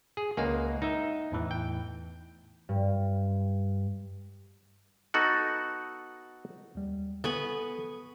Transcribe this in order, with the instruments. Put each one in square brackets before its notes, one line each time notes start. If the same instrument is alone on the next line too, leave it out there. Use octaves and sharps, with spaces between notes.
[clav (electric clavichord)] G#4
[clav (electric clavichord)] C#2 A#3 [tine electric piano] D#5 F#5 G#5
[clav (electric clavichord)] D#4 E5
[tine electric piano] E2 A2 E3
[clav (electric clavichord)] G5
[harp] G2
[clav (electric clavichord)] B3 D#4 F#4 A4 F#5
[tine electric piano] D#2 G3
[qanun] B3 G#5 B5 [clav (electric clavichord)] A4 [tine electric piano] C#6 D#6